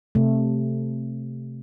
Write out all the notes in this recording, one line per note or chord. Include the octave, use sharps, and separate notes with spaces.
C3 A3